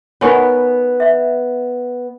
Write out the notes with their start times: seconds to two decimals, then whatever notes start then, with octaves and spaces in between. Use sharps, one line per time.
0.21 B3 D#4 A#4 B4 C#5 G#5 C#6
1.00 E5